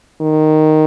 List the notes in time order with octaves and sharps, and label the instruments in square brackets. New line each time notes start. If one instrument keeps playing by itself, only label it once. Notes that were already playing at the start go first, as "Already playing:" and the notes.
[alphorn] D#3